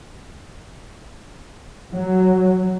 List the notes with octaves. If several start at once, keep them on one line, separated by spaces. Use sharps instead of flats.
F#3